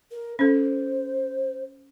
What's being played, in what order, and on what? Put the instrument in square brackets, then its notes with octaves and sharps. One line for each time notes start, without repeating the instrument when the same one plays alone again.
[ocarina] A#4
[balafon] C#4 A4 [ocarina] C5